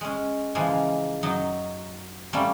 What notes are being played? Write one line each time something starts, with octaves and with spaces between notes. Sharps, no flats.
G#3 C#4
C#3 E3 F3 G#3 A#3
F#2 F#3 D#4
G3 A3 A#3 C4 C#4